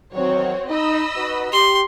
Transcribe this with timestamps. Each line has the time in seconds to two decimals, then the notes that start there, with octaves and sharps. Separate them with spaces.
0.13 E2 D#3 F#3 C4 F#4 C#5
0.70 D#4 D#5 B5 E6
1.16 D#4 F#4 B4
1.53 G4 C6